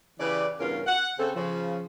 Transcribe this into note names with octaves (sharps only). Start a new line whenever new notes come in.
C#3 E3 G4 B4 D5
E2 G2 C#3 C#4 F4 A#4
F#5
C#3 C4 A4
C#3 F3